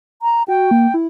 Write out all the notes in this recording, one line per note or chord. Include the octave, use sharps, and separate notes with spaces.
A#5
F#4 G5
A#3
E4